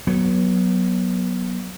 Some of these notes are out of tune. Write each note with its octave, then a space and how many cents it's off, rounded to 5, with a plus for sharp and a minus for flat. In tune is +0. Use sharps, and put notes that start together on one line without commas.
F#3 +0 B3 -25